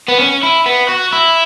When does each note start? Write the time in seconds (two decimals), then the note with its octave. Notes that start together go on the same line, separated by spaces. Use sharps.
0.08 B3
0.20 C#4
0.43 E4
0.66 B3
0.88 F#4
1.13 E4